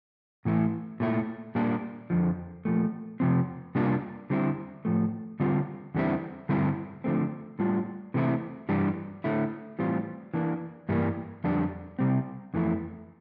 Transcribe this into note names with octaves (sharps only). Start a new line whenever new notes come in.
A2 E3 A3 E4
A#2 A3 E4
A#2 G3 A#3 D4
F2 D3 F3
A#2 F3 A3
C3 F3 C4
C3 G3 A#3 D4 F4
D3 G3 C4 E4
A2 F3 A3
D3 G3 C4 F4
E2 D3 G3 C4 E4
G2 D3 G3 C4 E4
D3 F3 A3 C4
A2 G3 D4 F4
C3 E3 A3 C4 E4
G2 E3 G3 D4
D3 A3 E4
A2 E3 G3 C4 F4
E3 A#3 D4
G2 E3 G3 A#3
F2 D3 G3 D4
C3 G3 C4
F2 E3 A3 E4